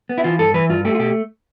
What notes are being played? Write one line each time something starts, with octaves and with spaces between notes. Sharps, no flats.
B3
E4
E3 F4
G2 A4
E3 B4
G2 F4
A3 G4
F4
B2 G4